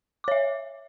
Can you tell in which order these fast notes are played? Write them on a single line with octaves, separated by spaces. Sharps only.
D6 C#5 E5